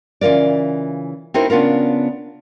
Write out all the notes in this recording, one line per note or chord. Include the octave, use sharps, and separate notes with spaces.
C#3 E3 F4 A#4 D5
C4 D#4 E4 F#4 A#4 C5
C#3 B3 D4 F4 A#4